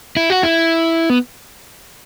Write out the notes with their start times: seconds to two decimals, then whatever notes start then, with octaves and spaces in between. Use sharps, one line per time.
0.17 E4
0.30 F#4
0.43 E4
1.10 B3